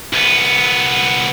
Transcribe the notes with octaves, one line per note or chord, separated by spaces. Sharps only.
C2 B3